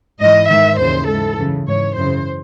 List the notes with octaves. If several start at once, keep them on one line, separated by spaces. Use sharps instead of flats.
G#2 E3 D#5
G#2 D#3 E5
D#2 C#3 E3 C5
G#2 E3 A4
F#2 C#3 E3
G#2 E3 C#5
F#2 C#3 E3 C5